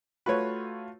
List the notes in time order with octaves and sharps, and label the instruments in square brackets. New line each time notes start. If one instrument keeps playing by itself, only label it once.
[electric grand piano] A3 F4 F#4 [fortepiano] B4 C#5